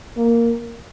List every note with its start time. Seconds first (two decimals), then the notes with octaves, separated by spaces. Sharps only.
0.17 A#3